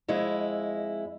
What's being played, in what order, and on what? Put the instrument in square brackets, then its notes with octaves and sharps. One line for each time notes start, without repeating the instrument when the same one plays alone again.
[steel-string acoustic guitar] F2 G#3 E4